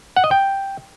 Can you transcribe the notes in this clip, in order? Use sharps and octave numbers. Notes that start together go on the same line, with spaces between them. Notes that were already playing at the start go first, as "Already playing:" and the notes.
F#5
D#5
G5